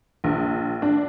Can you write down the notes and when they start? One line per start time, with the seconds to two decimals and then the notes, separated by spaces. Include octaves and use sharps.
0.24 A#1
0.82 D4